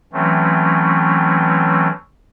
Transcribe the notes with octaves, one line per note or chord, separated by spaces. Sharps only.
E3 F#3 A3 C4 C#4